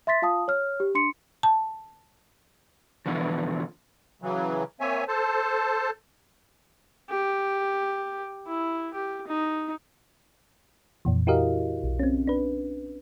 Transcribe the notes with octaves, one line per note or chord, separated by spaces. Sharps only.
E5 C6 A6 B6
F4 F5 A5 D#6
C#5 F6
G4
D4 C6 C#7
A5
E2 B2 D3 E3 F3
C#3 E3 F#3
A#3 C4 C#5 E5 G#5
A4 C5 A5
G4
E4
G4
D#4
F2 A#2 E3
E4 F#4 G4 A#4 D#5 F5
B1
C4 C#4
D4 B4